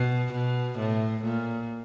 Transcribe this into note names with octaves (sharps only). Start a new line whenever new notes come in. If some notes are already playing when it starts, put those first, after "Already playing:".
Already playing: B2
B2
A2
A#2